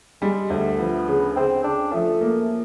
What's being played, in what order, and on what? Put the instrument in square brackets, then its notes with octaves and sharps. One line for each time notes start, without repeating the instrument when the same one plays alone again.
[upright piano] G3 [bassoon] G#3
[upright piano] D2 [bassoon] A3
[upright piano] F3 [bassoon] B3
[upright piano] C#3
[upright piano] C#3 [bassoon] C4
[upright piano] C#3 [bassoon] D4
[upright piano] F3 [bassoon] A3
[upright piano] A#3